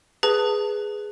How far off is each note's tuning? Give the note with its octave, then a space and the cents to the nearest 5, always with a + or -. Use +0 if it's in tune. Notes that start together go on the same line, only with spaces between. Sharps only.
G#4 +0 B4 +0 A5 +25